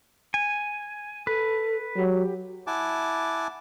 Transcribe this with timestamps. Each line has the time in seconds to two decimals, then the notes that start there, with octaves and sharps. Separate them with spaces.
0.34 G#5
1.27 A4 B4
1.97 F#3 G4
2.67 E4 F#5 G#5 A5 D6